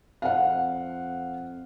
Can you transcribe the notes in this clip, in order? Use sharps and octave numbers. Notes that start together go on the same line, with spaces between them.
F2 F5 F#5